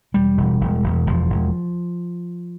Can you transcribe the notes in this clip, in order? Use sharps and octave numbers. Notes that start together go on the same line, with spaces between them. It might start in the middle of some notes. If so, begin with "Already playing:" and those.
E1 G3
E1
E1
E1
E1 F3
E1